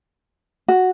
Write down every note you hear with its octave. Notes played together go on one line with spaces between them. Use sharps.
F#4